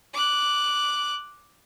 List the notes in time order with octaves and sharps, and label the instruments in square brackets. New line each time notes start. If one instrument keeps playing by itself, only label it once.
[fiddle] D6 F#6